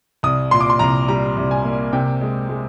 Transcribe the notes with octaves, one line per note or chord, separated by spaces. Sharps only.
C2 D#6
A#2 C6
D6
C6
C2 A#5
G3 A#5
C2
G#5
A#3
C3 G5
G#3
G#3